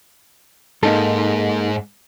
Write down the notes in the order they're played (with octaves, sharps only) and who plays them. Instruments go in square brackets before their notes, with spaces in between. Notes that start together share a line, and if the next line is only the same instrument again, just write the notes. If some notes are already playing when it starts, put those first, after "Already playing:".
[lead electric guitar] G#2 [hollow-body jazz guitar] A#3 D#4 A4